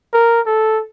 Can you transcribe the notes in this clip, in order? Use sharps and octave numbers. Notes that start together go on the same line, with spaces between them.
A#4
A4